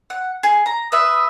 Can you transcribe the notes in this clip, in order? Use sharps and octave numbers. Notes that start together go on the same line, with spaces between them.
F#5
G#4
A#5
B4 E5 D#6